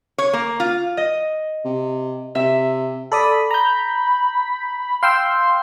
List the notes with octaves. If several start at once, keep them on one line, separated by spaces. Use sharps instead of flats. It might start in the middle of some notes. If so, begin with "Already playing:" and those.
C#5
A#3
F4
D#5
C3
C3 E5
A4 D5 B5 D#6
A#5 G6
F5 G5 C6 E6